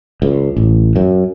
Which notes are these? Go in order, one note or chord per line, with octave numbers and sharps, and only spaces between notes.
C#2
A1
F#2